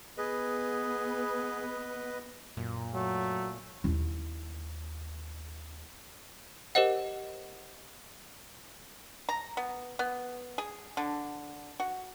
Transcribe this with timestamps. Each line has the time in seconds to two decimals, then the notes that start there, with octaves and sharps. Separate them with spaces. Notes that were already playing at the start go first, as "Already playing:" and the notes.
0.17 B3 G#4 B4 D#5
2.57 F#2 A#2
2.94 F#3 A3
3.84 D#2 E4
6.75 G4 A#4 C5 D#5 F#5
9.29 A#5
9.57 B3
9.99 B3
10.58 G#4
10.97 D3
11.80 F#4